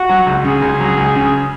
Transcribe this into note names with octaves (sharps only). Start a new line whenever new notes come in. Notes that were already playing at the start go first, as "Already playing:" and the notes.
Already playing: F#4
F#3
C#2
C#3 G#4
C#2
F#3
C#2
C#3